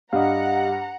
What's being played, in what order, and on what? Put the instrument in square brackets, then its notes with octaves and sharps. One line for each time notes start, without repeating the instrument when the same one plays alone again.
[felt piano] G2 [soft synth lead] G4 [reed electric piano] D#5 F5 [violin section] F#5 A#5